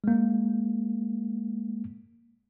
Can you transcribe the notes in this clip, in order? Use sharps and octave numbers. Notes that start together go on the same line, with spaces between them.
G#3 A#3